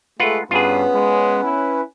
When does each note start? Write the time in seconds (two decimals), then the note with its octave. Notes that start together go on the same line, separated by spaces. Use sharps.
0.20 G#3 A3 F4 B4 F#5
0.51 G2 B3 C#4 F4 G#4 B4
0.95 G#3
1.44 E4